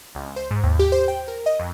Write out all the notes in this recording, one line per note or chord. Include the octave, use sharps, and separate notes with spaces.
C#2
C5
G#2
D#2
G4
C5
G5
A#4
D#5
F2